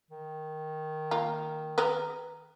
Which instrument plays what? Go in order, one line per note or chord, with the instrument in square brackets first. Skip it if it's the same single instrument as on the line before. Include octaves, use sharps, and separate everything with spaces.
[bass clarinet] D#3
[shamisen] A#3 F4 A#5
G#4 A#4 B4